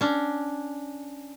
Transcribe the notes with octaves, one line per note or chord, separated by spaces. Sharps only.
C#4 D4